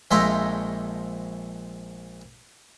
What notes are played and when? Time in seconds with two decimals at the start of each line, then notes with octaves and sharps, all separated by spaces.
0.11 A#1 F2 G#3 C5 E5 A#5